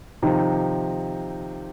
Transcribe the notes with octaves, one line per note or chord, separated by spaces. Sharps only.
C3 D#3 F3 D#4